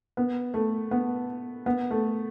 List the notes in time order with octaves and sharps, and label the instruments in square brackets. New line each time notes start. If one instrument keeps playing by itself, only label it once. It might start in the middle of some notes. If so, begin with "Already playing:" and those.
[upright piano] B3
A3
B3
B3
A3